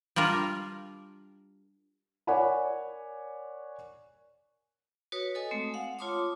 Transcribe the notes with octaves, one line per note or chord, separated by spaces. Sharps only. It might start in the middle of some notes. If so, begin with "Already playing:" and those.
G3 D4 F4 A#4
A#4 C#5 D5 F#5 G#5 B5
F#4 B4 C#5 D#6
A4 D#5 G#5 D#6
G#3 A3 C4
F5 F#5
F4 C#5 A5 C6 D6 D#6